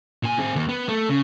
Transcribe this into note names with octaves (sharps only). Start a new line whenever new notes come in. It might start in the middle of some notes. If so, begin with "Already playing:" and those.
A#2 G#5
C4 G#4
D#2
B3
A3
C#3